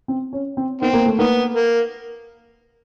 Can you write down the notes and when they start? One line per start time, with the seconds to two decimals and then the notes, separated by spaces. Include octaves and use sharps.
0.08 C4
0.33 C#4
0.57 C4
0.81 D#3 B3 C4
0.93 A#3
1.06 A3
1.18 D#3 A#3 B3
1.55 A#3